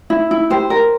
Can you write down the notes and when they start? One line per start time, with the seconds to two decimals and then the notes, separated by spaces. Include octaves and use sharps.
0.10 E4
0.31 E4
0.50 G4 C5
0.70 A#4